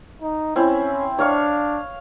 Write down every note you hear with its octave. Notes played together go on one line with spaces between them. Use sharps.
D#4
C4 C#4 E4
D4 C#5 F5 C#6